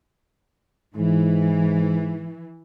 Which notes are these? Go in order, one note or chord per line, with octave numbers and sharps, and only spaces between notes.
G#2 E3